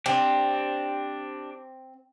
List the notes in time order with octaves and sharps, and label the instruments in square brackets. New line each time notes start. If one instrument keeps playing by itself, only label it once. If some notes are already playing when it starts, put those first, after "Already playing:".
[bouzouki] C4 [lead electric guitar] D4 G4